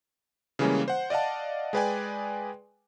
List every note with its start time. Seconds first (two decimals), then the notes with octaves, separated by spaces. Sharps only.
0.59 C#3 E3 G3 G#3 A#3 C#4
0.88 C5 F#5
1.10 D5 D#5 F5 F#5 A5
1.73 G#3 G#4 B4 D5 G5 G#5